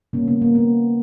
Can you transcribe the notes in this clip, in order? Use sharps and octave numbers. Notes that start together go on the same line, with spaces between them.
C#3 G3 A#3 C#4
B3
A#3
B3